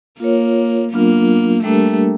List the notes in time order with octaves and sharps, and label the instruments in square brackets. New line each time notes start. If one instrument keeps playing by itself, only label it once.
[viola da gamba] A#3 [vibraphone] F4 A#4 C#5
[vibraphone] F#3 B3 D4 F4 A#4 [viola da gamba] A#3
[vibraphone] G3 A#3 D4 G4 A#4 [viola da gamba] A3